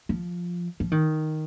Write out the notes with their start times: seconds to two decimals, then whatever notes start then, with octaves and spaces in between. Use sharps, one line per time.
0.09 F3
0.80 F3
0.92 D#3